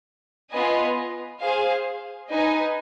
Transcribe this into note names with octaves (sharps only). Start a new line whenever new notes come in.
B3 F4 B4 D#5 G#5
G#4 C5 F5
D#4 B4 D#5 G#5